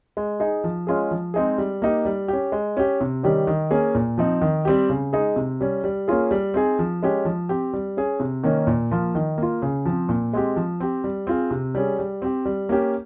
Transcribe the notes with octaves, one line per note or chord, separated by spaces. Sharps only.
G#3
D#4 G#4
F3
G#3 C#4 F4 G#4
F3
G#3 C4 D#4 G#4
G3
A#3 D#4 G4
G3
C#4 G4
G#3
C#4 G4
C3
D#3 G3 C#4 G4
D#3
A#3 C#4 G#4
A#2
F3 C4 D#4
D#3
G3 C4 G4
C#3
G#3 D#4 G#4
C3
G3 C#4
G3
A#3 C#4 F4 G#4
G3
C4 D#4 G#4
F3
G#3 C#4 G4
F3
C4 G4
G3
C#4 G#4
C3
D#3 A#3 C#4
A#2
F3 A#3 F4
D#3
A#3 F4
C#3
F3 C4
A#2
G#3 C4 G4
F3
C4 G4
G3
C4 F4 G#4
C3
G3 C#4 G#4
G3
C4 G4
G3
A#3 C#4 G4